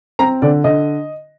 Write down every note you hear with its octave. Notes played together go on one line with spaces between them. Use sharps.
C4 A#5
D3 D5
D3 D#5